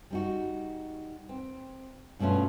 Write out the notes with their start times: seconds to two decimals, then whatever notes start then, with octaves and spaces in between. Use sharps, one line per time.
0.10 G3 D#4 F#4
1.29 C4
2.19 G2 B2 A3 C#4 F4